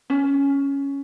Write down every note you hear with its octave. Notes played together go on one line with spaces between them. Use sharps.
C#4